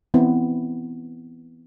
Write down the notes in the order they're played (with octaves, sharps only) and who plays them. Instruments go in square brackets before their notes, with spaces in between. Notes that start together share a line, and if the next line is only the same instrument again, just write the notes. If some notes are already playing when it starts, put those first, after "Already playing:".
[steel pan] E3 B3 C4 E4